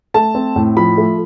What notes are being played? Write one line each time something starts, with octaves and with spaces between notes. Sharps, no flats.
A3 A5
C4
A2
F3 B5
A3